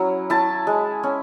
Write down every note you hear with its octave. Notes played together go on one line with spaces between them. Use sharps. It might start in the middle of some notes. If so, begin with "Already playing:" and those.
Already playing: F#3 C#4 E4
E4 A5
G#3
C#4